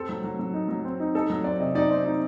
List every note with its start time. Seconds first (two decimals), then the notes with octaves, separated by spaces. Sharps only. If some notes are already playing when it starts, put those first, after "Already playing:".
Already playing: C4 A4
0.09 F#3
0.24 F#3
0.39 F#3
0.54 D#4
0.69 F#3
0.85 C4
1.00 D#4
1.15 D#4 A4
1.30 F#3
1.44 C4 D5
1.60 C3 D#5
1.75 D#4 D5
1.90 C4
2.05 D#4